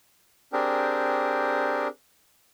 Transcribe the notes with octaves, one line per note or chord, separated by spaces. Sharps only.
C4 D4 G4 G#4 A#4